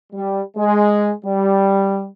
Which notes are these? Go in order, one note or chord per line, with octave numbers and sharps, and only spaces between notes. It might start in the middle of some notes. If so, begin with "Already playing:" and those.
G3
G#3
G3